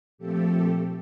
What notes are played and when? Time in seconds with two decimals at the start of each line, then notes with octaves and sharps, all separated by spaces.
0.18 A#2 F3 A3 C4 G4 A4